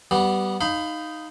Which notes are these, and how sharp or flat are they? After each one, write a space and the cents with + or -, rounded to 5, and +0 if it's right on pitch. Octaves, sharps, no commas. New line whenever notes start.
G3 -25 B3 +0 D5 +0
D#4 +0 F5 +0 B5 +25